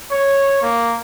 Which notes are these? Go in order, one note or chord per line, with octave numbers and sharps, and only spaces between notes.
C#5
A#3